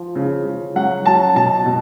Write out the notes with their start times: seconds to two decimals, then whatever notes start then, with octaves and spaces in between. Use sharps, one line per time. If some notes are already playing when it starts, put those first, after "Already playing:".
Already playing: F3
0.15 C#3
0.45 C#3
0.75 F#3 F#5
1.06 F#3 A5
1.36 B2 A5
1.66 B2